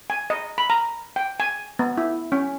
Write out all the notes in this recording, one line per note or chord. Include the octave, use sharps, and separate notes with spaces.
G#5
D#5
B5
A#5
G5
G#5
B3
E4
C#4